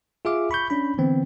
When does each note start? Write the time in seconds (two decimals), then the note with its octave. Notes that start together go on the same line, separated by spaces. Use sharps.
0.25 F4 G#4 E5 F5 D6
0.51 B5 C#6 G6
0.70 C#4 D4 B5
0.98 D3 E3 B3 C4